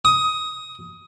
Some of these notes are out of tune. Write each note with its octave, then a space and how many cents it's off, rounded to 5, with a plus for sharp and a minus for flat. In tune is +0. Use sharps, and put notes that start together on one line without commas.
D#6 +15